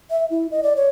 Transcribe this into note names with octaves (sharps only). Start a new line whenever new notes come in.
E5
E4
D#5
D5
C#5